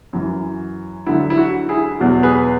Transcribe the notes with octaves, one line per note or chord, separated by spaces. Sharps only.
F#2 E3
D2 D3 F#3 E4
E4
F#4
E4 G#4
E2 B2 F#3
G#4 B4